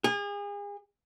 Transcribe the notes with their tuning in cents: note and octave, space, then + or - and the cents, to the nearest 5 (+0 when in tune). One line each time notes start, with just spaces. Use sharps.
G#4 -35